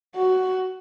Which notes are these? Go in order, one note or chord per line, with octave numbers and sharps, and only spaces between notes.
F#4